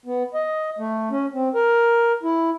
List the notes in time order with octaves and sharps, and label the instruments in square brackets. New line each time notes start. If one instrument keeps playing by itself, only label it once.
[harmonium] B3
D#5
A3
C#4
C4
A#4
E4